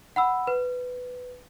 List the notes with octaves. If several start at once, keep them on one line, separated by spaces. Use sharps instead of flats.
F#5 B5 E6
B4